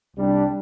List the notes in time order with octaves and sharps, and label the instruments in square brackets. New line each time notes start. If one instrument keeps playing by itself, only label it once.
[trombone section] C2 C3 G3 D4 G4